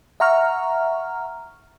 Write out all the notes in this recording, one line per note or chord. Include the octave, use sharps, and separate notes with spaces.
E5 F#5 A#5 C#6 F6